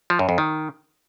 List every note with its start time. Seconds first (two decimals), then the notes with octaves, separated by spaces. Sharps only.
0.10 F3
0.19 F#2
0.29 F2
0.38 D#3